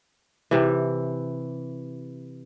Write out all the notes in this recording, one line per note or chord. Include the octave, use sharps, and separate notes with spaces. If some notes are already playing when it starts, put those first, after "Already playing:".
C3 E3